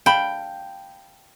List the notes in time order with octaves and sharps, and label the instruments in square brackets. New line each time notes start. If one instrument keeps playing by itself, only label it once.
[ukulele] F5 A5 B5 [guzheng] G5